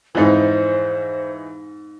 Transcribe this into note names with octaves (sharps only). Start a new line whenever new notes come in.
F2 G#2 E3 D#4 C5